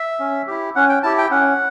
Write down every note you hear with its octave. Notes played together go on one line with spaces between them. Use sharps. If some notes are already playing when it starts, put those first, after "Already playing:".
Already playing: E5
C#4
E4 G4
C#4 F#5
G5
E4 G4 A5
G5
C#4 F#5